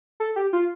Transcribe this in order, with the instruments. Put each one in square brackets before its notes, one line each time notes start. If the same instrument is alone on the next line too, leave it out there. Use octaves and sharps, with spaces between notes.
[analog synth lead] A4
G4
F4